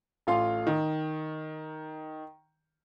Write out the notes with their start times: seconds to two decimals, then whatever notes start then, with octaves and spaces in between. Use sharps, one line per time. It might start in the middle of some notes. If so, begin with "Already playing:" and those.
0.27 A1 A3 F4 F5 C6
0.67 D#3